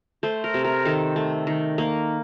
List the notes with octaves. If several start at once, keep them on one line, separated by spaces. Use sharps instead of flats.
A3 C5
A#4
C3
A#4
D#3 A4
A3
D#3
A#3